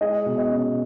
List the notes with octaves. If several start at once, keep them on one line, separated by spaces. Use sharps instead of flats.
G#3 D#5
B2
D#5
C#4